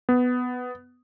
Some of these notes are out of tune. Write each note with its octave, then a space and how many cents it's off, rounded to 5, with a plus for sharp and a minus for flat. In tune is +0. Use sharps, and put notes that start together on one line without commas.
B3 +10